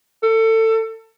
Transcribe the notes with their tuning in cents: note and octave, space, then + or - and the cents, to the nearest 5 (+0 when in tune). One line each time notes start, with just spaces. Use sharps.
A4 +25